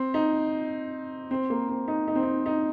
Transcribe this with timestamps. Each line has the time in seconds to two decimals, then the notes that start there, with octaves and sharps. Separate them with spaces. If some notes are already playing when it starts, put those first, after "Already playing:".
Already playing: C4
0.14 D#4
1.31 C4
1.50 A#3
1.69 C4
1.88 D#4
2.08 D#4
2.15 C4
2.23 D#4
2.46 D#4